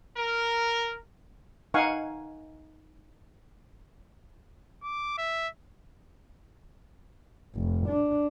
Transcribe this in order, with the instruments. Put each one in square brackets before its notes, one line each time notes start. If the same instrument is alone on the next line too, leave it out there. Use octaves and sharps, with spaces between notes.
[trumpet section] A#4
[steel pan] D#4 F5 F#5 G#5 C#6
[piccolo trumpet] D6
E5
[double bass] F1
D4